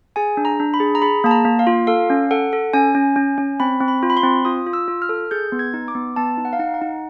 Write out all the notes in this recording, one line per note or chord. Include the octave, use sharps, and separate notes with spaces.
G#4 G#5
D4
A#5
D4
B5
G#4
A#5
G#4 B5
A#3 A5
A#5
A#3
F5
F4
A4 F5
C#4
A4 F#5
A4
C#4 G#5
C#4
C#4
C#4
C4 B5
C4
B5
F4
B5
C6
C4
F4 D#6
F4
E6
F4
F6
A4
G#4 G6
B3
G#6
D#4
D6
B3
B3 A5
D#4
F#5
F5
D#4 F#5
F#5
D#4